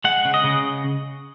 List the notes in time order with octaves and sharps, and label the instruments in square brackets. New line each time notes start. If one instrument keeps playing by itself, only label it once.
[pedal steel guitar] G#3 F#5
C#3
D#5
C#3